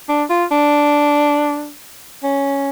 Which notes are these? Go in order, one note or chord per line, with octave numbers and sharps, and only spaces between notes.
D4
F4
D4
C#4